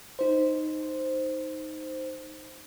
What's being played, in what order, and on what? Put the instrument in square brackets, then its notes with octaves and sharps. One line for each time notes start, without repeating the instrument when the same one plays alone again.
[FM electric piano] D#4 C5